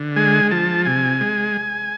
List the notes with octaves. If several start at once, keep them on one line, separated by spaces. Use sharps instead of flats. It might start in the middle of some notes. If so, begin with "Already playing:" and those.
Already playing: D3
G#3 G#5
F3 A5
C3 G#5
G#3